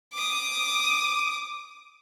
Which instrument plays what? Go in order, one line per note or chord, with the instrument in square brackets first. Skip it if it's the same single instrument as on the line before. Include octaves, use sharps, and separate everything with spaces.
[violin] D6 D#6